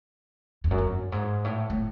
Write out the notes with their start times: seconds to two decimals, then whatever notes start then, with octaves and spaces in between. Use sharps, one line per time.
0.64 F2
0.71 F#2
0.78 G2
1.12 G#2
1.44 A2
1.70 A2